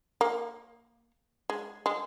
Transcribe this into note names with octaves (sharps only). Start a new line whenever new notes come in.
A#3
G#3
G#3